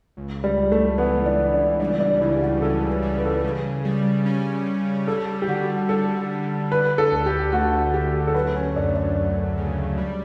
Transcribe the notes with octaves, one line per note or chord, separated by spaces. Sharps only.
C#2
G3
C#2
A3
E3 B3
D4
C#2
D4
G3 D4
D4
C#3 E4
G4
F#4
C#3 A4
B4
G3
B4
A4
B4
C#3
G3
C#4
G3
G3 A4
G4
D3 F#4
G3 A4
D3
D3 B4
A4
D2
G4
A3 F#4
D2 G4
A4
F#3 B4
C#4
F#2 D4
D4
F#2
C#3
G3